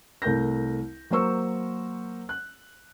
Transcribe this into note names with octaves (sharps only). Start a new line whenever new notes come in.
C2 A3 A#4 G6 A#6
F#3 A#3 A#4 C5 C#6 E6
F#6